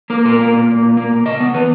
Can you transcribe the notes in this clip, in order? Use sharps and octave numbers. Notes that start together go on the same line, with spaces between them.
A#3 A#4
A#2 A#4
A#3
A#2
A#3
A#2
A#3
A#2
C#3 D#5
B3
E3 B4